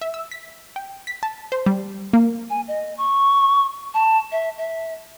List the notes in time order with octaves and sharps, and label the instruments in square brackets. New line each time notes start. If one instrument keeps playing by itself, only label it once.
[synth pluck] E5
E6
B6
G5
B6
A5
C5
G3
A#3
[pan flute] G#5
D#5
C#6
A5
E5
E5